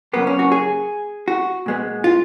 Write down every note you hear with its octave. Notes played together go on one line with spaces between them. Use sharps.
C#3 F#3 A#3 B3
C#4
F#4
G#4
F#4
A#2 G#3 B3
F4